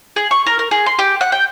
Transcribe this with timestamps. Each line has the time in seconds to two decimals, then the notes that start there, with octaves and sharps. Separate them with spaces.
0.16 G#4
0.31 C#6
0.46 A#4
0.59 A#4
0.71 G#4
0.86 C6
0.99 G4
1.21 F#5
1.32 G5